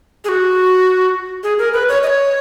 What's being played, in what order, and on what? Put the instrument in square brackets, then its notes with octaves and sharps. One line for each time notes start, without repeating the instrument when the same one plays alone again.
[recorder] G#4
F#4
G#4
A#4
B4
C#5
D#5
C#5